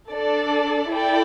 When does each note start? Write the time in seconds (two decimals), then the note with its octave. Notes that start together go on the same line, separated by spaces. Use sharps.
0.11 D4 A4 D5
0.92 E4 A4 D5 G5